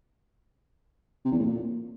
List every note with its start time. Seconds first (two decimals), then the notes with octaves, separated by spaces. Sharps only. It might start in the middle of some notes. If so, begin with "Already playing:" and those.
1.25 C3
1.32 E2
1.39 A2
1.46 A#2